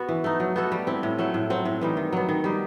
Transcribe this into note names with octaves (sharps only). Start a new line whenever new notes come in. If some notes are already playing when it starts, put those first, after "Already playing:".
Already playing: B3 F#4
E3
A3 D#4
F#3
B3 F#4 A4
G3
C4 E4
A2
F#3 A3 E4
A2
F#3 C4
A2
E3 G3 D#4
D#3
F#3 B3
D#3
G3 D#4